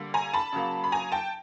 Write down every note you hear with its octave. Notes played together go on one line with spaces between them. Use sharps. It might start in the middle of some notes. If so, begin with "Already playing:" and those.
Already playing: D3 G3 A#3
G#5 A#5
A5 B5
C#3 F#3 A#3
B5
G#5 A#5
G5 A5